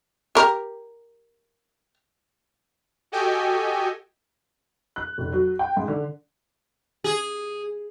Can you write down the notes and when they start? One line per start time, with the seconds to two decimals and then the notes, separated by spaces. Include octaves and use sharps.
0.35 G4 A#4
3.12 F#4 G4 A4 D#5 G5 G#5
4.96 F#6
5.18 F1
5.32 F#3
5.59 G5
5.77 G#2
5.88 D3
7.04 G#4